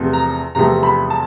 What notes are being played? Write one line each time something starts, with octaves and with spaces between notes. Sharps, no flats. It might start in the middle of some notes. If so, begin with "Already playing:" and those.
Already playing: E2 C3 F3 A3 C4
A#5
E2 C3 F3 A3 C4 A#5
B5
A5